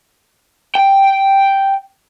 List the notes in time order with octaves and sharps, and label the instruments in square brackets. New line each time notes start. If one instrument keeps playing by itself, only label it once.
[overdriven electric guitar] G5